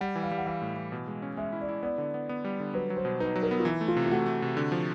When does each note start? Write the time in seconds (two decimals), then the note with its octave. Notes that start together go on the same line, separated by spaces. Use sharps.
0.01 G3 F#5
0.15 E3
0.23 F5
0.31 G3
0.38 F#5
0.46 E3 F5
0.62 A2
0.76 E3
0.92 B2
1.08 G#3
1.22 C#4
1.37 G#3 E5
1.52 E4
1.61 D5
1.69 E4
1.83 B3 D5
1.98 D3
2.14 B3
2.29 B3
2.45 G3
2.60 D3
2.74 F#3 B4
2.90 F#3
2.97 C5
3.05 B2
3.20 D#4 B4
3.36 F#3
3.43 A#4
3.51 B3
3.60 F4
3.65 E3 E4
3.81 A3
3.88 F4
3.97 C3
4.06 F4
4.11 A3 F#4
4.26 A3
4.42 C3
4.57 D3
4.72 F3